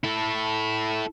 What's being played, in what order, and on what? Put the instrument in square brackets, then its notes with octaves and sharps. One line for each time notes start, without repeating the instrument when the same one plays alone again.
[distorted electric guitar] E4 A4